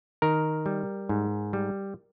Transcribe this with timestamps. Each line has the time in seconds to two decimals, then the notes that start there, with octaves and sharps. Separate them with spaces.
0.22 D#3 A#4
0.66 G3
1.09 G#2
1.53 G3